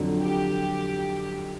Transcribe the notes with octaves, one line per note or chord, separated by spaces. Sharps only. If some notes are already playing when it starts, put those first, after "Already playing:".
Already playing: F2 D3 F#3
G4